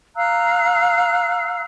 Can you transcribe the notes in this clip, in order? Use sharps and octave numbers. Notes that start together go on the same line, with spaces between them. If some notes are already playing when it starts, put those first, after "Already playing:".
F5 A#5 E6 F#6